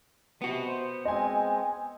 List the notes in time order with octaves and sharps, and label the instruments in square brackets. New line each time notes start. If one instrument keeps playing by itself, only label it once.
[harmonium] C3 [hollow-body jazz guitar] B3 F#4
[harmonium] C5
[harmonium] G#3 C4 C5 [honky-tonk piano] D#5 G#5